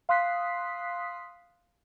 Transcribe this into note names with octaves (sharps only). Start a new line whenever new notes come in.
F5 C6 D#6 F#6 B6 C7